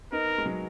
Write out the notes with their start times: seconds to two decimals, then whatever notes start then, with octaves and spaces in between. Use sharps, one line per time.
0.12 B3 D#4 A#4
0.38 G#3
0.46 F#3